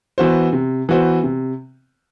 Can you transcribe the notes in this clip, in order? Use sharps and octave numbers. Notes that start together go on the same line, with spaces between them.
E3 B3 F#4 C5
C3
E3 B3 F#4 C5
C3